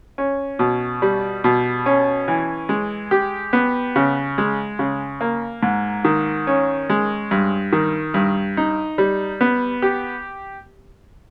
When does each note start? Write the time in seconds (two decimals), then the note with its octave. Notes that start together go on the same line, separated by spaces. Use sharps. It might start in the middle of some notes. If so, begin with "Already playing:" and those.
0.18 C#4
0.59 B2
1.02 G3
1.44 B2
1.86 C#4
2.28 E3
2.69 G#3
3.11 G4
3.53 B3
3.96 C#3
4.38 G#3
4.79 C#3
5.21 A#3
5.63 G#2
6.04 D#3
6.47 C#4
6.90 G#3
7.31 G2
7.73 D#3
8.14 G2
8.57 D#4
8.98 G3
9.41 B3
9.82 G4